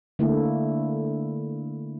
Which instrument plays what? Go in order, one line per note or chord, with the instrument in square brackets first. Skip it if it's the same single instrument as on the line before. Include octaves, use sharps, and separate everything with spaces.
[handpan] D3 A3 A#3 E4